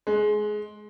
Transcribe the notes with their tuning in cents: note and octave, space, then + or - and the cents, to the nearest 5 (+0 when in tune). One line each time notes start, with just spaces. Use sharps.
G#3 +20